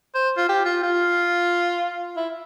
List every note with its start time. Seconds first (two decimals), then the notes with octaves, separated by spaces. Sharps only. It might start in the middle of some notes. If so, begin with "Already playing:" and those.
0.15 C5
0.37 F4
0.49 G4
0.65 F4
0.83 F4
2.17 E4